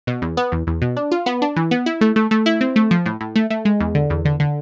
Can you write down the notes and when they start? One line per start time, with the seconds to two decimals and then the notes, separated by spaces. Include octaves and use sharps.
0.07 B2
0.22 E2
0.37 B3
0.52 E2
0.67 E2
0.82 B2
0.97 D4
1.12 F4
1.26 B3
1.42 D4
1.56 E3
1.71 B3
1.86 E4
2.01 A3
2.16 A3
2.31 A3
2.46 E4
2.61 C4
2.76 A3
2.91 F3
3.06 A2
3.21 A2
3.36 A3
3.50 A3
3.65 G#3
3.80 E2
3.95 D3
4.10 E2
4.25 D3
4.40 D3